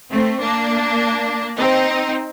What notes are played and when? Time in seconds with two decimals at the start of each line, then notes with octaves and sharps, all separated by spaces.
0.11 A3 C4
0.41 A#3 D4
1.58 C4 D#4